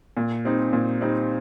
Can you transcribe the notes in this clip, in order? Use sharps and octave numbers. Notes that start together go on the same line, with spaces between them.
A#2
G3 C4 D#4
A#2
G3 C4 D#4